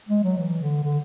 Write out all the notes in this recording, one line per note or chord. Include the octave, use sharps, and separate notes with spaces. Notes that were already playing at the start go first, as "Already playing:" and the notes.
G#3
F#3
E3
D3
D3